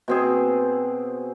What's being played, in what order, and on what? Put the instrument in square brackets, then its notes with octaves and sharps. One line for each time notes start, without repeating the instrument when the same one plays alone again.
[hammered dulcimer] B2 C4 G#4